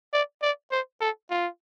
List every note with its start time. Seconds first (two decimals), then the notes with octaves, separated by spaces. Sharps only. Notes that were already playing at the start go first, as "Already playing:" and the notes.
0.13 D5
0.42 D5
0.71 C5
1.01 A4
1.30 F4